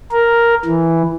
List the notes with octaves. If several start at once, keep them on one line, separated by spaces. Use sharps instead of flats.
A#4
E3